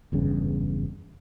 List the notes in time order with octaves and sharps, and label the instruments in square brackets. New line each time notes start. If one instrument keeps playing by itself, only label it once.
[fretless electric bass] F#1 E2 G2 C#3